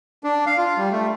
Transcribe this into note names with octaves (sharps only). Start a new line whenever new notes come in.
D4
F5
F4
G3
A3